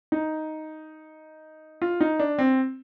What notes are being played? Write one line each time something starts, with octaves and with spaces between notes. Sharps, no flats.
D#4
F4
D#4
D4
C4